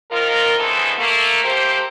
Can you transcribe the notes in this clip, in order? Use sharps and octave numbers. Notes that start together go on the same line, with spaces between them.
D#3 F3 F4 A#4
D2 B2 E3 G#3 C4 A4
A3 A#3
A3 A#3 G4 C5